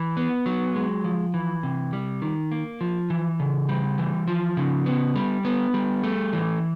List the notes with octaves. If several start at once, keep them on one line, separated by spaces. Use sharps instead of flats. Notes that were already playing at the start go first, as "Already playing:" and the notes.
Already playing: E3
B3
F#3
G#3
F3
E3
C3
G3
D#3
A#3
F3
E3
C#3
G3
E3
F3
C#3
B3
G3
B3
G3
A3
E3